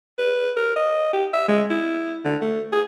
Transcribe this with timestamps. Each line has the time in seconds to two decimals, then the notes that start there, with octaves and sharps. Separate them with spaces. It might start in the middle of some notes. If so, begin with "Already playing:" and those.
0.19 B4
0.57 A#4
0.76 D#5
1.13 G4
1.33 E5
1.49 G#3
1.70 E4
2.25 D3
2.41 A3
2.72 G#4